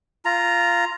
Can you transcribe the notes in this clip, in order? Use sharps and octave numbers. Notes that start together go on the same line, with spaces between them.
F4 A#5